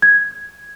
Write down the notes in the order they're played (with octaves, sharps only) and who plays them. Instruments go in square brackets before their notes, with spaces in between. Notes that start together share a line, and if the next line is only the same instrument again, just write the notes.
[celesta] G#6